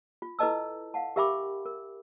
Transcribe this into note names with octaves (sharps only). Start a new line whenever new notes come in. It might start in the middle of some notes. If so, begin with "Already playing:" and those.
F4
E4 A4 B4 D#5 A5 E6
F5 F#5 A5
G4 A#4 E5 G5 B5 D6
A#4